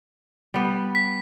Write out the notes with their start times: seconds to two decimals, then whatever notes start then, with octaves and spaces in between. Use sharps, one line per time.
0.54 G3 B3
0.95 B6